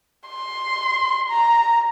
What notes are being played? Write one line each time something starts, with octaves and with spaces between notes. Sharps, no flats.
C6
A#5